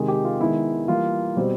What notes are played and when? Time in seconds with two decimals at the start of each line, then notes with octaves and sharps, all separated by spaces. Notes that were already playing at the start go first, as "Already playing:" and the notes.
Already playing: C3 D#3 G#3
0.08 G4
0.25 F4
0.40 D#3 G#3 B3 E4
0.88 E3 G3 A#3 F4
1.36 B2 G3 C4